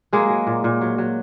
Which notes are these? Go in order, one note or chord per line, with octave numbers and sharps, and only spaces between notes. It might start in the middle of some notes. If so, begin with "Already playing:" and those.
F#3 G#3 A#3
F#3
A#2
A#2
F#3
F#3